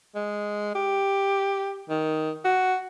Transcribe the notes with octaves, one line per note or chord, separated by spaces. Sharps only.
G#3
G4
D#3
F#4